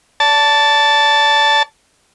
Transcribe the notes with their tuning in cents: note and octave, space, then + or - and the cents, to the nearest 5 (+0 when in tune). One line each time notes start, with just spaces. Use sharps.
D5 -35 A5 +0